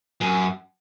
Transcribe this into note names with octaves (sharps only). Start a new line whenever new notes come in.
F#2